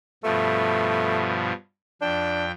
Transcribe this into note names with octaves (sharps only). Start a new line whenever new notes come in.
G2 B2 F3 A3
F2 D4 G5